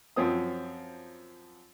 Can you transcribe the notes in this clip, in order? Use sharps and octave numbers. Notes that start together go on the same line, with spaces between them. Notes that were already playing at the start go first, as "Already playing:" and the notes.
F#2 F3 C4 D#6